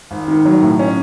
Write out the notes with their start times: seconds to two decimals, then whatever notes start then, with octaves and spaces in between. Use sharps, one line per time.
0.11 G#1
0.28 D#3
0.46 F#3
0.63 A2
0.79 C#4